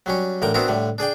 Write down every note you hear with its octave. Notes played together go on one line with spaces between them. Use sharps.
F#3 G3 C#4
A1 D3 A#4 G5
B3 C4 D4 E4 F#4 A#4
A2 D3 G3
D4 G#4 D5 G5